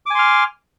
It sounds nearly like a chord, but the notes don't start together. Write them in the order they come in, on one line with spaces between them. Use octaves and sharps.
D6 G#5 C6 F6